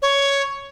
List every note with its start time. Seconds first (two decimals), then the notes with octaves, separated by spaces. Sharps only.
0.02 C#5